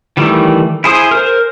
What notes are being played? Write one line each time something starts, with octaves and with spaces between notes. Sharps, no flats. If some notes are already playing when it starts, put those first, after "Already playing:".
D#3 E3 G3 A3
E4 G#4 C5 D#6
A#4 C5